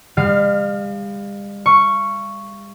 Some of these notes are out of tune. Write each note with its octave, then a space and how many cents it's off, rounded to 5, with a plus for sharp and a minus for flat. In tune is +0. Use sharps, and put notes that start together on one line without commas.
G3 +45 F5 +0
F5 -40 C#6 +0